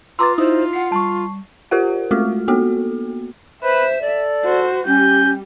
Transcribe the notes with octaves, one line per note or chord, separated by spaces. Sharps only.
F4 B4 A#5 C6 D6 E6 A6
D#4 E4 C5 D#6
F#5 C7
G3 A5 C#6
F4 G4 A#4 C5 F#5
G#3 A3 F4 F#4 F6
A#3 B3 F#4 A4
B4 C5 E5
A4 D5
F#4 C5
G3 C#4 G4 G6